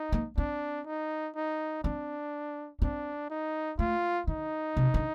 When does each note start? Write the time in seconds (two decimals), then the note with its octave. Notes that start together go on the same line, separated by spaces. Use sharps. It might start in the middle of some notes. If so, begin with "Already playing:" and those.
Already playing: D#4
0.13 A#3
0.37 C4 D4
0.86 D#4
1.35 D#4
1.84 C4 D4
2.82 C4 D4
3.30 D#4
3.79 A3 F4
4.27 D3 D#4
4.77 C3
4.94 D3